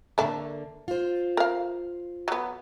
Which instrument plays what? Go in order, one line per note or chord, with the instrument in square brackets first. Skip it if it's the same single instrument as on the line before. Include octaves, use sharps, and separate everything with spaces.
[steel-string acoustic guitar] D3 A#3 [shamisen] A3 D4
[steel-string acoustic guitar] F4 C5
[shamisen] A#4 F5
F#3 B3